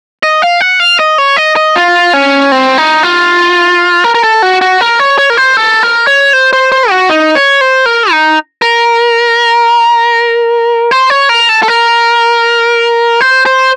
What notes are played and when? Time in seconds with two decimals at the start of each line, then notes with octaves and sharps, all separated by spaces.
0.23 D#5
0.42 F5
0.61 F#5
0.80 F5
0.99 D#5
1.18 C#5
1.37 D#5
1.56 D#5
1.76 F4
2.13 C#4
2.52 C4
2.78 D#4
3.03 F4
4.04 A#4
4.15 A#4
4.23 A4
4.42 F#4
4.61 F#4
4.81 A#4
5.00 C#5
5.18 C#5
5.30 A#4
5.37 C5
5.57 A4
5.83 A#4
6.07 C#5
6.33 C5
6.53 C5
6.72 C5
6.90 F#4
7.09 D#4
7.35 C#5
7.61 C5
7.86 A#4
8.11 D#4
8.62 A#4
10.91 C5
11.10 C#5
11.29 A#4
11.49 A4
11.63 A4
11.68 A#4
13.21 C5
13.46 C5